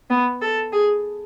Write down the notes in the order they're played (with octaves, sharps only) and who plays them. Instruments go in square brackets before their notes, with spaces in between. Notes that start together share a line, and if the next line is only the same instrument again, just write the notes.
[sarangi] B3
A4
G#4